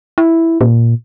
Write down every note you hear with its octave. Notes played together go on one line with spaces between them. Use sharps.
E4
A#2